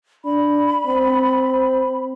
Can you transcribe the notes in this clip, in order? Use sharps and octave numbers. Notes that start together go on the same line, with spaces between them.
D4 B5
C4